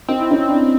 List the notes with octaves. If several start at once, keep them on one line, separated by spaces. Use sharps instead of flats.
C4 D#4
E4
C#4 D#4
D4 E4